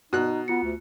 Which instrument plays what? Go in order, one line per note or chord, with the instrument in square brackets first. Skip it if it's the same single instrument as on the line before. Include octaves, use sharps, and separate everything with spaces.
[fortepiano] B2 F#6 [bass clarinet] D#4
[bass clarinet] B3 [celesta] F4 C#7
[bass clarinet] D2